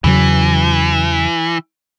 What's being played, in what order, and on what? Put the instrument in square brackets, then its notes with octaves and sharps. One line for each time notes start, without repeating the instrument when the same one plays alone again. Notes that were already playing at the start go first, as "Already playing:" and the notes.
[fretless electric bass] E2 C#3 F#3 [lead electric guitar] E3